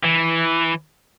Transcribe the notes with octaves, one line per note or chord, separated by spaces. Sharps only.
E3